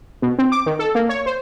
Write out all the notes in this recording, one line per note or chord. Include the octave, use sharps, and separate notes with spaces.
B2
C4
D6
D#3
A4
A#3
C#5
C5